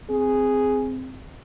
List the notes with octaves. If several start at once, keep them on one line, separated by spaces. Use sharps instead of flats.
C4 G#4